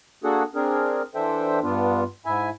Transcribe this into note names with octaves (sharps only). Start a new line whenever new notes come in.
A#3 D4 F#4 G#4 A4 F#5
C4 D4 G#4 A#4
E3 D4 A4 C5 E5 G5
G2 B3 D4 F4
G#2 E4 E5 G#5